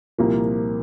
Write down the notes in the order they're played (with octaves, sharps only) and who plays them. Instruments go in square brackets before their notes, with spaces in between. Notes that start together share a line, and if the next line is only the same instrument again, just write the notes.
[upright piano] C2 A#2 F3 A#3